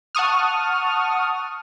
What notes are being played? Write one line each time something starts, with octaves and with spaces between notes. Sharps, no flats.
F#5 A5 C#6 D#6 F6